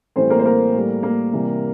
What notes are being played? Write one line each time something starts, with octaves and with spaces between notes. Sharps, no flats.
A2 E3 G3 C4 C5
A#3 A#4
C5
A#3 A#4
A2 G3
A#3 A#4
C3 E3 G3